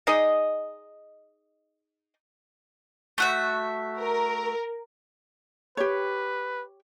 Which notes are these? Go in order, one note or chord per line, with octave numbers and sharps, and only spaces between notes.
D#4 G#4 D5 D#5
A3 F#4 E5
A#4
G4 B4 C#5